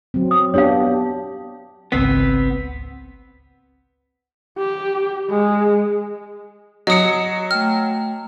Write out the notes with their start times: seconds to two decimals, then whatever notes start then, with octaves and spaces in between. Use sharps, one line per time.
0.14 F#3 C4
0.31 D#6
0.54 B3 D4 G4 C#5 F5
1.92 G#1 C#2 B3 C4 B6
4.58 G4
5.30 G#3
6.87 F#3 D#5 D#6 C#7
7.51 A3 G5 F6